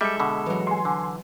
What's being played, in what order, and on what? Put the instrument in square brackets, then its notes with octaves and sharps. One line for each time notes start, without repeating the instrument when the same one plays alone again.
[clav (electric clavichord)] G3 [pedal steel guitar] G#3 A4 [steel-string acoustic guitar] E5
[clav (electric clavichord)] B2 D3 [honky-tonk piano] B5
[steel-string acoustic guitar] E3 F#3
[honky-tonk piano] G#5 C6
[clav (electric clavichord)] D3